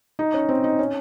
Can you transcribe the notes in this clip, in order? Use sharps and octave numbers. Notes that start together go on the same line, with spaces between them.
D#4
C#4
C4
D#4
C#4